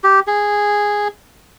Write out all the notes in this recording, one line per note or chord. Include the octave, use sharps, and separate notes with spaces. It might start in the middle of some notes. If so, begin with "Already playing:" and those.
G4
G#4